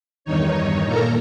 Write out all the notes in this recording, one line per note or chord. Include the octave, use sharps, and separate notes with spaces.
E2 G2 D#3 D#4 C#5
A#2 A#3 A4 A#4 A#5